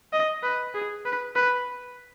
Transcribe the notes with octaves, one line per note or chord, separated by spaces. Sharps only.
D#5
B4
G#4
B4
B4